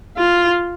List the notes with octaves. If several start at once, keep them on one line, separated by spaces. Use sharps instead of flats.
F4